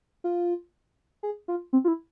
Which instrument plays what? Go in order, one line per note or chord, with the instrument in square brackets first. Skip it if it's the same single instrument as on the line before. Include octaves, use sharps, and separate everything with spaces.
[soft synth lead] F4
G#4
F4
C4
F4
E4